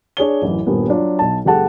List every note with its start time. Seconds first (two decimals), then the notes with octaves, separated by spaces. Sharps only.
0.17 D4 G#4 C#5 G7
0.42 A1 F#2 E3
0.67 D#1 G2 A#3 B3
0.88 F#3 D4 F4
1.19 B1 A5
1.45 F#1 G#3 G4 A4 F#5 A5